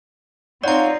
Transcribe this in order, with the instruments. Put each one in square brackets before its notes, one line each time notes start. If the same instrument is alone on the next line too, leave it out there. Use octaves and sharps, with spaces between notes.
[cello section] C4 D#4 F4 [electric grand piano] C#5 F#5 [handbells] D5 A#5